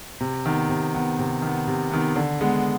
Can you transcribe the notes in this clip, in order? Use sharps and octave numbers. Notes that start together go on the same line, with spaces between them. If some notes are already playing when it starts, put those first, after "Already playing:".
C3
D#3 B3
C3
D#3 B3
C3
D#3 B3
C3
D#3 B3
D3
G#3 B3